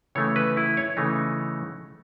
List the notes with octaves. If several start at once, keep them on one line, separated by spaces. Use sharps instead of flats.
C#3 E3 A3 D#4 C#5
B4
E4
C#5
C#3 E3 A3 D#4